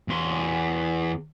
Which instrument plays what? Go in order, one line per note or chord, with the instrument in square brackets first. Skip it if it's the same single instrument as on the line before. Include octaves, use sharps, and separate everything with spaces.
[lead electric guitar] E2 C6